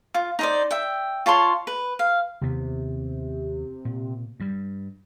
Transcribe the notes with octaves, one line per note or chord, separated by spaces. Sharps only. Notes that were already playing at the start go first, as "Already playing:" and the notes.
F4
D#4 C5 D5
E5 G5
F4 C#5 A5 C6
B4
F5
D#2 C3 B3
A#2
G2 G3